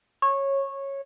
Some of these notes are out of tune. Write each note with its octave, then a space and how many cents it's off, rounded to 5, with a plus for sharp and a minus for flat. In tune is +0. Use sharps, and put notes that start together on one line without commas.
C#5 -15